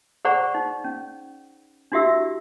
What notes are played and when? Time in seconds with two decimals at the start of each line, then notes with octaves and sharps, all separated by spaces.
0.25 G#4 C5 D5 F#5 A#5 C#6
0.55 D#4
0.84 C#4
1.92 D4 E4 F#4 G4 E5 E6